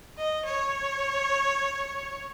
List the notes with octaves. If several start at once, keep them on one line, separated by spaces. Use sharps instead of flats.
D#5
C#5